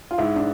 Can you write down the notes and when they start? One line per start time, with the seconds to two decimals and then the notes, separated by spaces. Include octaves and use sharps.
0.11 F4
0.18 G#2 E4
0.36 D4